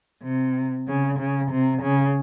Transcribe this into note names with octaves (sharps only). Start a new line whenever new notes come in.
C3
C#3
C#3
C3
C#3